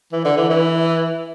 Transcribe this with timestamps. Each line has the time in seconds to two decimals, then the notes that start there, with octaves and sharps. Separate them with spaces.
0.12 E3
0.25 D3
0.37 E3
0.50 E3